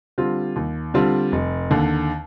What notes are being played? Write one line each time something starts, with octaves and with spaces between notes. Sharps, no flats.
D3 G3 C4 F4
D#2
D3 G3 C4 F4
F1
D#2 D3